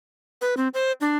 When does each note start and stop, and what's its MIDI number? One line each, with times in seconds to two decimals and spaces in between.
0.41 0.55 71
0.57 0.68 60
0.74 0.92 72
1.01 1.17 62